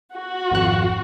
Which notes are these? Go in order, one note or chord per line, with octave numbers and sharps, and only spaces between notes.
F#4
G#1 F2 F#6